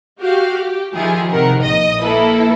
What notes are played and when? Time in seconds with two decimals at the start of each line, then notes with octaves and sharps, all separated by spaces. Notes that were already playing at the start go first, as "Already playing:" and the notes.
0.19 F#4 G4 F5
0.58 G4
0.93 D#3 F3 E4 F4 G4 G#4
1.30 C3 D#3 A#4 F#5
1.61 A#1 D#5 D#6
2.01 A#3 E4 A4 B4